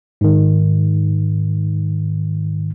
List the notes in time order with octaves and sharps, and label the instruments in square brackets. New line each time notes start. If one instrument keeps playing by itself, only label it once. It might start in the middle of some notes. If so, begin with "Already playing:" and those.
[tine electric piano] G#2 D#3